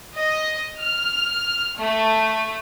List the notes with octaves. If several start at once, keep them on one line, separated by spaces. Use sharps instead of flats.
D#5
F6
A3